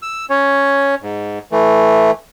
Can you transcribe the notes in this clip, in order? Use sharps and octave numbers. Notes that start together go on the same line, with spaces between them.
E6
C#4 C#5
G#2
E3 A3